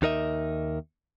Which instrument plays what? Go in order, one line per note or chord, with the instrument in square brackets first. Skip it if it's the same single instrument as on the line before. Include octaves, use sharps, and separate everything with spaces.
[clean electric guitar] D#2 D#4 A#4 D#5 E5